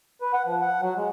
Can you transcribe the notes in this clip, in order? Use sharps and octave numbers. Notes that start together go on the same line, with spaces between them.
B4
F#5
F3
F#5
F#3
G#3